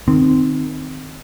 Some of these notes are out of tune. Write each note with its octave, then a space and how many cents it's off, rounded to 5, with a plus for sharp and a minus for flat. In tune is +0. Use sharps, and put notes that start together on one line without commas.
D#3 -15 C4 -10